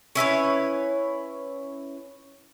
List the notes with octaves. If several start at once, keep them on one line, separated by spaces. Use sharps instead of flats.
C#4 E4 B4 C#5